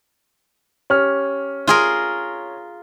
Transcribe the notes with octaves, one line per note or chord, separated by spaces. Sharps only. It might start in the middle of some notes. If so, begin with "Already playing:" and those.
C#4 G4 F6
F4 G#4 A#4